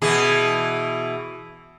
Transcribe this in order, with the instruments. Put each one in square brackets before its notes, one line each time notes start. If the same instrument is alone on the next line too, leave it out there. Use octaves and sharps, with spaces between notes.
[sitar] B2 E3 G#4